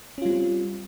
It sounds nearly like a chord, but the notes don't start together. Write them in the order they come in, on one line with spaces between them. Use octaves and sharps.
C#4 F4 G3 C4